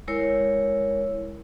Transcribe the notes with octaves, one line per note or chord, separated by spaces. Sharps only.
G#3 E4 A#4 C#5